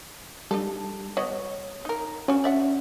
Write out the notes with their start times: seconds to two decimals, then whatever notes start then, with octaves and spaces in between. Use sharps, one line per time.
0.51 G3 D4 D#4 A4
1.17 B3 F#4 C#5 D#5
1.85 D#4 A#4
2.28 C#4 D4 F#4
2.44 D5 E5 F#5